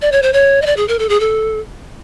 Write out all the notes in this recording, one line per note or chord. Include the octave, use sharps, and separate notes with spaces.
D5
C#5
C5
C#5
D#5
D5
G#4
A#4
A4
G#4
A4